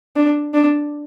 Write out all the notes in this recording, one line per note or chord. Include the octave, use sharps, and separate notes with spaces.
D4
D4